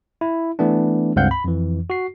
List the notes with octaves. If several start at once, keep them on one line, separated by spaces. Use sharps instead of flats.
E4
E3 A3 B3 D4
C#2 G2 C4 F5 F#5 G6
B5
F2 E3
F#4 C7